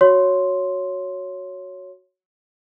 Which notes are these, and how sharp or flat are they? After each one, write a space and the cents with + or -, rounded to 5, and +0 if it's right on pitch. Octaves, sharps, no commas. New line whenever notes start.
F#4 +0 C#5 +0 C6 +0